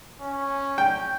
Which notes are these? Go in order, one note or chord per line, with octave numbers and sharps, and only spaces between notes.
C#4
G5